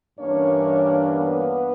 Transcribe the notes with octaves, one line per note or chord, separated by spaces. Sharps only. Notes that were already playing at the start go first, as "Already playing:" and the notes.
G2 E3 A#3 C#4 D4 C#5
B3 B4